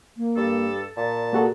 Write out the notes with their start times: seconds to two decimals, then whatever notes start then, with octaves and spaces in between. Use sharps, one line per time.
0.17 A#3
0.36 G2 A4
0.97 A#2 D5 A5
1.33 A#3 F#4 G#4 A4